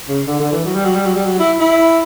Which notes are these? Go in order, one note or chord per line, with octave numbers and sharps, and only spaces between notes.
C#3
D3
D3
E3
F#3
G3
F#3
G3
F#3
G3
F#3
E4
E4